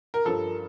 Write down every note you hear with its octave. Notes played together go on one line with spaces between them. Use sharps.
A#4
G2 F3 A4